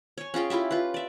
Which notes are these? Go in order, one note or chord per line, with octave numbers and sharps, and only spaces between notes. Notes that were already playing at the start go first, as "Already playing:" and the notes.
C#5 G#5
C#4 F4 G#4 G5
E4 F4 G4 E5
F4 B4
D5 E5